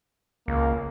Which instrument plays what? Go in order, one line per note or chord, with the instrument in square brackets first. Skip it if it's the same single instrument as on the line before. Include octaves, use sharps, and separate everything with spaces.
[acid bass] C#2 [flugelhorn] A#3